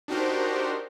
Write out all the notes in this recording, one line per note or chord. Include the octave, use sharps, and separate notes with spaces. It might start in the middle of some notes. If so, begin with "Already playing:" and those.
D4 D#4 F#4 G4 A#4 C5